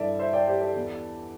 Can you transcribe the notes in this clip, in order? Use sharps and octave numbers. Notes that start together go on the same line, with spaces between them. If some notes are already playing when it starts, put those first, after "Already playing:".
Already playing: G2 E3 A4 D5 E5
C5 E5
D5 G5
G4 C5
A4 D5
E2 E3